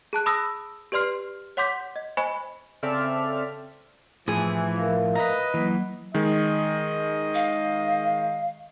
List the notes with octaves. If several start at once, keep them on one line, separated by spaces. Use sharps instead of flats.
G#4 A5 F#6
A5 B5 D#6 E6 A#6
G4 B4 D5 C6 F6 C7
C#5 F#5 C6 D6 G6 B6
D#5
C5 D#5 G#5 B5 C#6
C#3 C4 A4 D5 E5 F6
A2 E3 F3 G#4
A#4 E5 F5
B4 D#5 A#5
E3 F#3 A#3
D#3 G#3 D#5
F5